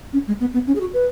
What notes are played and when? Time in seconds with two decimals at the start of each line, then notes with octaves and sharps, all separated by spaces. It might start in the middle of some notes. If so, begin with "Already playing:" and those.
0.13 C#4
0.27 G#3
0.40 B3
0.54 B3
0.67 C#4
0.76 G#4
0.81 F#4
0.94 B4